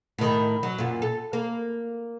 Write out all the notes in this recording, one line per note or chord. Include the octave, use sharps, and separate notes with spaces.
A2 D#3
F#3
F#2 A#2
A4
A#3